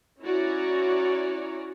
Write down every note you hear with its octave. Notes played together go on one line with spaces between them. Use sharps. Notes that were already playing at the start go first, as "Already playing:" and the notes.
C#4 E4 F#4 C#5 D5 A#5